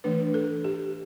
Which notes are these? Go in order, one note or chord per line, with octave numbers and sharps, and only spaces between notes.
E3 A3 D4 B4
A4
G4